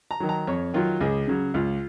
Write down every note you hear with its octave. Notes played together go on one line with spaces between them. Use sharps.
A#5
D#3 F#3
A#5
F2 C#5
D#3 F#3 F4
C#2 G#4
C#3 F#3
C#2 F4